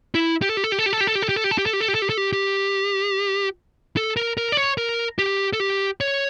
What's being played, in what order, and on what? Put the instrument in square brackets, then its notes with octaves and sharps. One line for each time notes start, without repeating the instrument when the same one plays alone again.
[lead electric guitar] E4
G4
A4
G4
A4
G4
A4
G4
A4
G4
A4
G4
A4
G4
A4
G4
A4
G4
A4
G4
A4
G4
A4
G4
A4
G4
G4
A4
A#4
A#4
D5
C#5
A#4
G4
A4
G4
C#5